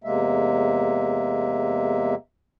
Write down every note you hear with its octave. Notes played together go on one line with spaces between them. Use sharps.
E2 C3 G#3 A#3 E5